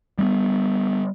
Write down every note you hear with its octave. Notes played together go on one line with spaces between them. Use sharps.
G3 A#3 B3